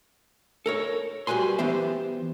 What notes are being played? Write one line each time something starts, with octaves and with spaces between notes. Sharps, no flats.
A4 A#4 C#5
G3 F#4 B4 G#5 C6
E3 B3 G4 C5 E5